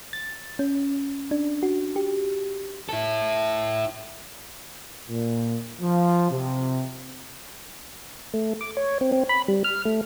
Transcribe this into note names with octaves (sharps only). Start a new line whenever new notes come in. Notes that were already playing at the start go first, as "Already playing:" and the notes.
A6
C#4
D4
F#4
G4
E4 A4
A#2
F3
C3
A3
D6
C#5
C4
C4
B5
G3
F6
A3